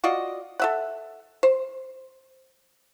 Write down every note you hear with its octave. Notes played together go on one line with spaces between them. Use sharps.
F4 F#4 D5 D#5
A4 E5 F#5
C5